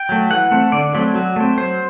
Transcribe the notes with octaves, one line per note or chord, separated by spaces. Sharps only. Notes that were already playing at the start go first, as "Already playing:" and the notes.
Already playing: G5
F#3 A3
E3 F#5
A3 C4
D3 D5
F#3 A3 C4
F#3
A3 C4
F#3 C5